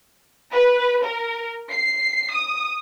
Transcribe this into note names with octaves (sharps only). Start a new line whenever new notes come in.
B4
A#4
C7
D#6